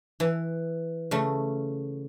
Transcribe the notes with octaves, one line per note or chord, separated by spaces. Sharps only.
E3
C#3 A3